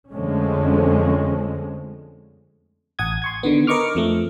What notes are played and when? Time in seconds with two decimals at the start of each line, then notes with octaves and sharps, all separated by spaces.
0.11 F2 D3 F3 G#3 A3 C#4
2.99 A1 F#5 D#6 G#6
3.22 C6 C#6 G#6
3.43 D3 D#3 B3
3.67 A#4 B4 D#5 C#6 D6 F6
3.95 F2 F3 A3